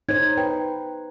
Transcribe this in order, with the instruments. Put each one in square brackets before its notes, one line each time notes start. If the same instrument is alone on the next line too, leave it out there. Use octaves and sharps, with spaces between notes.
[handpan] D#4 C5 [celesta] C#5 G#6
[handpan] B4 [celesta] G5